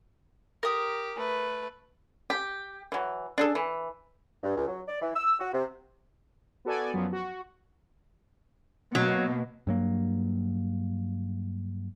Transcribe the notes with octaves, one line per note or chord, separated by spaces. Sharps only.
G4 A#4 D#6
A3 B4
G4
E3 F#3
D4 G#4 A4
E3
G2
C#2
F#3
D5
E3
E6
F#4
C3
B3 F#4 A4 D5 G#5
F#2 F3 F#3 B3
F#4
B2 F#3 A#3
G2 F#3 A#3